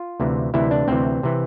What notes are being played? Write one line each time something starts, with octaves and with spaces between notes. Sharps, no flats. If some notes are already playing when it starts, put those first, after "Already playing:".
Already playing: F4
D2 C3 E3
D2 C3 E3 E4
D4
D2 C3 E3 C4
C3 E3